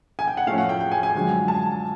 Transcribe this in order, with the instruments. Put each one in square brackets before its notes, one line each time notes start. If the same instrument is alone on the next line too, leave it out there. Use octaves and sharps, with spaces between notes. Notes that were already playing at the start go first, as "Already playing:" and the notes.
[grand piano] G#5
G5
F#5
A2 F3 A3 C#4 F5
F#5
G5
G5
G#5
G#5
F#2 D3 F3 G#3
A5